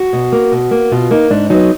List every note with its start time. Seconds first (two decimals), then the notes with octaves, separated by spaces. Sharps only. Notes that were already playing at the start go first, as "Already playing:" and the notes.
Already playing: F#4
0.13 B2
0.33 A#3
0.52 B2
0.71 A#3
0.92 B2 F4
1.11 A#3 D#4
1.30 G#2 D4
1.50 F#3 B3 D#4